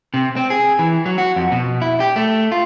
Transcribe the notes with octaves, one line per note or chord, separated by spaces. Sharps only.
C3
C4
G#4
E3
F#3
F#4
F2
B2
E4
G4
A3
F4